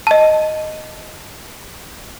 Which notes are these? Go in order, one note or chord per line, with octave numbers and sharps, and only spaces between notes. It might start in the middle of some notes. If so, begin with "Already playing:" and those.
D#5 A5